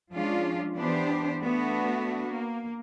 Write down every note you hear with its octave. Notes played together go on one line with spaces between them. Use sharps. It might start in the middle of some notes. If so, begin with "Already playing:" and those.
F3 G#3 C#4 D4 F4
E3 B3 D4 G4 C5
A3 B3 D4 F#4
A#3